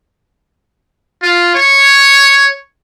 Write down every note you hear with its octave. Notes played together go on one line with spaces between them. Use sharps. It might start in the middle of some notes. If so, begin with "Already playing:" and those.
F4
C#5